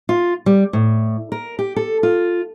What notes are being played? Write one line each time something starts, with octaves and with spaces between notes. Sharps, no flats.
F4
G3
A2
A#4
G4
A4
F4